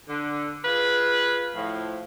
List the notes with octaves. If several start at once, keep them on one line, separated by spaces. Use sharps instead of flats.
D3
F4 G#4 B4
A2 F3